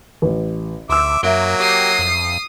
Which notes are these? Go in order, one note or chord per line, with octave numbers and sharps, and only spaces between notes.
A1
D2 E5 C6 D6 E6
F#2 F#3 A#3 E5 D7 G7
G4 D#6 C7
F2